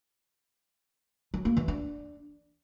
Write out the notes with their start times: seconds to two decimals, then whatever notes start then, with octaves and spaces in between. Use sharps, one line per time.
1.34 F#3
1.45 A#3
1.57 E3
1.68 D4